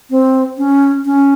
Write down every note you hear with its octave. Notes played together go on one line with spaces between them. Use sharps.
C4
C#4
C#4